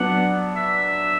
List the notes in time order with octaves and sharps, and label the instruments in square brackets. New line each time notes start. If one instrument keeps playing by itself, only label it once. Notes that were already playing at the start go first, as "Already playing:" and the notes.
Already playing: [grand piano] F#3 B3 D4 [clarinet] F#5
[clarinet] E5